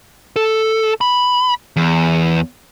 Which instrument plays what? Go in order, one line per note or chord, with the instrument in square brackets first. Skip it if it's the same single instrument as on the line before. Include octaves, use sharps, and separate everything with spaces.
[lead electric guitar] A4
B5
E2